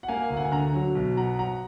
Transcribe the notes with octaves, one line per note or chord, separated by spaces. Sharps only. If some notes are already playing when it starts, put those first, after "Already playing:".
F#5
A#3 F5 G#5
D2
F#5
G#5
D3 F#5 A#5
F#3
B1
B2 F#5 A#5
F#3 F#5 A#5